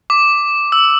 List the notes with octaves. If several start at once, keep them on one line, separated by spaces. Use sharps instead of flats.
D6
E6